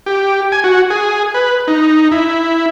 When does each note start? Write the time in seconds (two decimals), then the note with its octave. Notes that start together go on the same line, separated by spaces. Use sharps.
0.06 G4
0.52 G#5
0.64 F#4
0.90 G#4
1.34 B4
1.68 D#4
2.12 E4